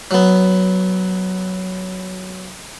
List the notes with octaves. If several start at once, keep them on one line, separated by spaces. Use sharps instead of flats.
F#3 B3